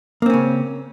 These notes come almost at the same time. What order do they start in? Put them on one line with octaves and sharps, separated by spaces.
A#3 C4 C#4 C#3